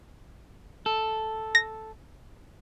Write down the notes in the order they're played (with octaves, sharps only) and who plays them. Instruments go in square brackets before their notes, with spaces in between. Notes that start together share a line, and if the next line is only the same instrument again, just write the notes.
[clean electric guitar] A4
[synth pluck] A#6